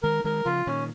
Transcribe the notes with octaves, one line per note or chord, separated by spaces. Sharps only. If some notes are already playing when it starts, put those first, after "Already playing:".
D#3 G#3 A#4
D#3 G#3 A#4
C#3 F3 F4
A#2 D#3 C#4